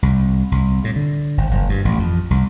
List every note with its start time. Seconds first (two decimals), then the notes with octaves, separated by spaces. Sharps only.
0.03 C2
0.52 C2
0.84 A2
0.96 D3
1.38 G#1
1.51 F#1
1.69 G2
1.85 A1
1.99 F2
2.31 C2